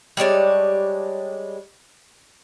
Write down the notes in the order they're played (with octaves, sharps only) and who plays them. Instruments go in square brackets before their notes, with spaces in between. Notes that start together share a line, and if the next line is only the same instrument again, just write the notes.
[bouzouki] G3 G#3 D4 C#5